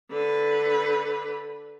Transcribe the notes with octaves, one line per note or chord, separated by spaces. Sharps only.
D3 B4